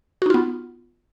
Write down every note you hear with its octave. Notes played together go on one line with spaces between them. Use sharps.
B3 D#4 F4 F#4